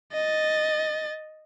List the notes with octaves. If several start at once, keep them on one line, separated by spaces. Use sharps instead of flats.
D#5 A6